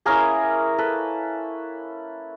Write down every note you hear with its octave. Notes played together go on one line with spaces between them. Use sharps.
A#3 C#4 E4 G#4 A#4
A4 B4